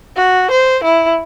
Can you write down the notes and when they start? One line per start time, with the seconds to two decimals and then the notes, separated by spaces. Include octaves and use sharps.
0.16 F#4
0.51 C5
0.84 E4